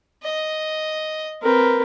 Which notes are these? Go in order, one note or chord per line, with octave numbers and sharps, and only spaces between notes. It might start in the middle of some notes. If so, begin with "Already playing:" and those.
D#5
C4 A#4 B4